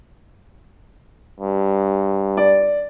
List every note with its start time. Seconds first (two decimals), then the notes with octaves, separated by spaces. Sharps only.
1.40 G2
2.37 D5